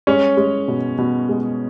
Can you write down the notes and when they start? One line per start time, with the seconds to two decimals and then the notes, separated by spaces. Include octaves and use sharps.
0.07 G#3 C#4 C#5
0.37 G#3
0.68 B2
0.98 B2
1.29 G#3